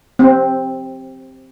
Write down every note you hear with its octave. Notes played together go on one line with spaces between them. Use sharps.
C4